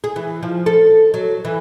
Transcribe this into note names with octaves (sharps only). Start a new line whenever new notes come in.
G#4
E3
F3
A4
F#3
E3